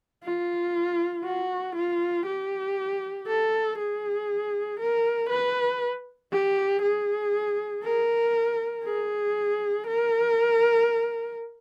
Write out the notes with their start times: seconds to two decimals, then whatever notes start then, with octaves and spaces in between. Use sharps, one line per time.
0.24 F4
1.24 F#4
1.76 F4
2.26 G4
3.27 A4
3.78 G#4
4.80 A#4
5.30 B4
6.32 G4
6.82 G#4
7.84 A#4
8.85 G#4
9.87 A#4